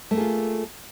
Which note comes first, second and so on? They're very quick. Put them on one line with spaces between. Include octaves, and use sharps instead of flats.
A3 A#3 G#4 F4